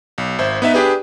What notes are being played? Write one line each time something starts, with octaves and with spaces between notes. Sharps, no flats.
B1
G#1 C5 E5
B3 D#4 B4 E5
D4 G4 G#4 B4